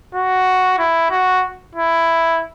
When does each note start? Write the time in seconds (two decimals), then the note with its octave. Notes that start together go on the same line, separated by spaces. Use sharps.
0.15 F#4
0.79 E4
1.11 F#4
1.76 E4